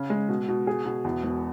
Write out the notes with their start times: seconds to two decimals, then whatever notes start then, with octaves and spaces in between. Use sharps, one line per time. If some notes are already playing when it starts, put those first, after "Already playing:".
Already playing: C#3
0.10 G#3
0.29 B2
0.48 B2
0.67 G#4
0.86 B2
1.04 E2
1.23 E1